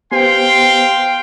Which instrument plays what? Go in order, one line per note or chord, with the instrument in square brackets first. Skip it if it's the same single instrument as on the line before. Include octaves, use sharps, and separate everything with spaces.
[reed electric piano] B3 G4 C5 [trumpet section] F5 G5 [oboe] C6